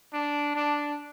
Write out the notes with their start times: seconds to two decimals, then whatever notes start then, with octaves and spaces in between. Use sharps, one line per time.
0.13 D4
0.56 D4